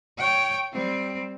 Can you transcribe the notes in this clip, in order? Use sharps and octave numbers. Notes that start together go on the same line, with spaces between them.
C#5 G5
G3 C4